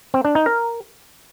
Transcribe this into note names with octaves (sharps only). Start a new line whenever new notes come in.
C4
D4
D#4
A#4